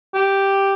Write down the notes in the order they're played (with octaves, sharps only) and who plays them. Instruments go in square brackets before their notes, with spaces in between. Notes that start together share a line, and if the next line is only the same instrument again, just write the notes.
[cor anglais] G4